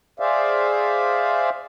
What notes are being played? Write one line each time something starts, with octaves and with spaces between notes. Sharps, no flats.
G#4 C5 D5 E5 F5